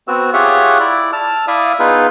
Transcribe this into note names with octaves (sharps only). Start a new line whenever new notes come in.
B3 C4 F#4 E6
F4 G4 G#4 C#5 E5 F#5
E4 D5
A5 E6 F6
E4 D5 E5 F5 D#6
B3 D#4 F4 G#4 B4